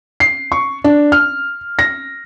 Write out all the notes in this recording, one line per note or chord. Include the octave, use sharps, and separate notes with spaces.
C7
C#6
D4
F6
A#6